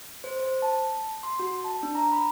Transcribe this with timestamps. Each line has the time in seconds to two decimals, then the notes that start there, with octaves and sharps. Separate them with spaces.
0.24 C5
0.40 C5
0.62 A5
1.23 C6
1.39 F#4
1.64 A5
1.83 D4
1.95 A#5
2.12 B5